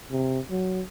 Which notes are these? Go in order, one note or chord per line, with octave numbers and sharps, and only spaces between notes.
C3
F#3